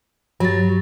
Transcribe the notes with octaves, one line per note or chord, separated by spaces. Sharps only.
G2 F#3 A6